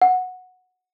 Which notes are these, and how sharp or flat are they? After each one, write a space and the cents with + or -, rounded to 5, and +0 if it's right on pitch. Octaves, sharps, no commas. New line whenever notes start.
F#5 -10